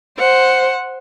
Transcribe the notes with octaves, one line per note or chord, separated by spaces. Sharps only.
C5 F#5